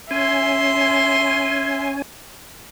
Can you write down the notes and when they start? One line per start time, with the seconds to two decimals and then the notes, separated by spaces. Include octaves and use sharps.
0.11 C#4 E5 G#5 C6